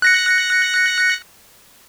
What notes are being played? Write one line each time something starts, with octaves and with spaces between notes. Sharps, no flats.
F#6 A#6 C#7